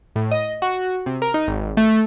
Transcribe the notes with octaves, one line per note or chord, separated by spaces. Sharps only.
A2
D#5
F#4
C3
A#4
D#4
G#1
A3